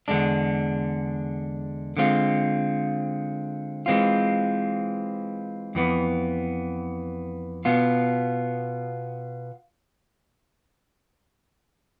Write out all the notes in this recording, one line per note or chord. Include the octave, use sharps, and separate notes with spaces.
E2 D3 G#3 D4
D3 G#3 C4 F4
E3 G#3 C4 F4
F2 E3 B3
B2 B3 F4